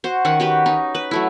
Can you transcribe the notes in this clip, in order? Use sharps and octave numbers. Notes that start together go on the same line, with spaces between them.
F#4 C5
D#3 C#4 F#5
F#4 G4 B4
C#4 D#4
B4
F#3 A3 E4